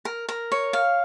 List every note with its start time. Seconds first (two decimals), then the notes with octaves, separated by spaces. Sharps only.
0.05 A#4
0.29 A#4
0.52 C#5
0.73 F5